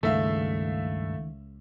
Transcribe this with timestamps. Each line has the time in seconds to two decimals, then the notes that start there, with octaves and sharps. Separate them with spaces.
0.03 C#2 G2 D#3 A3 E5 F5